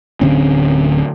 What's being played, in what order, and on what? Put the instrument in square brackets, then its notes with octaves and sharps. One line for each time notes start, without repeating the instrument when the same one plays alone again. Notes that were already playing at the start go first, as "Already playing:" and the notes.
[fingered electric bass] D1 D3 C4 C#4